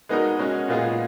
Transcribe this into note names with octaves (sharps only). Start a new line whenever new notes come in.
G#3 B3 D#4 F#4 A#4
G#3 C#4 F#4 A#4
A#2 G#3 B3 F4 G#4